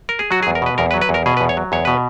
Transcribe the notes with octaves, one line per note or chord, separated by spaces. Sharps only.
A#4
G#4
F#3 F#4
G#4
E2
A#4
B2 B4
E2 A#4
B4
F#3
B4
E2
A#4
B2 G#4
B4
E2
C#5
F#3
E2 C#5
B2 B4